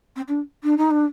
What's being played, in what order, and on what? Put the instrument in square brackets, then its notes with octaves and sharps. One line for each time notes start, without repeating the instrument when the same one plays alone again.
[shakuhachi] C4
D4
D4
D#4
D4